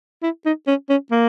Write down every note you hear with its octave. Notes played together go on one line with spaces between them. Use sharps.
E4
D#4
C#4
C#4
A#3